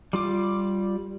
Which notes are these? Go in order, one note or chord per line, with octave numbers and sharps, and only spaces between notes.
G3 F4 D6